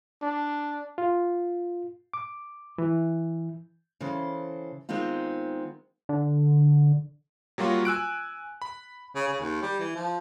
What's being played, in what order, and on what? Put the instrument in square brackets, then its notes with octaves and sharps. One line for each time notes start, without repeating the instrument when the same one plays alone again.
[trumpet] D4
[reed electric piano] F4
D6
E3
[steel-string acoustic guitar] C#3 E3 A4 C5
D#3 G#3 B3 C4 D#4 F4
[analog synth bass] D3
[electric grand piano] F#3 G3 A#3 F4 F#4
G#5 E6 F#6 D7
B5
[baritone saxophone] C#3
C#3
D#2
G3
E3
F3